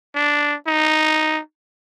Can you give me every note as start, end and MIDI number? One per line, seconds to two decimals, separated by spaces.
0.16 0.56 62
0.67 1.41 63